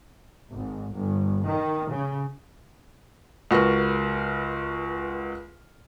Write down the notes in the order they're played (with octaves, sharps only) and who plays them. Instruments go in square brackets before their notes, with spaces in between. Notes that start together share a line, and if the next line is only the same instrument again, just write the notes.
[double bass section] G#1
G1
D#3
C#3
[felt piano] C#2 F#4 A#4 B4 F6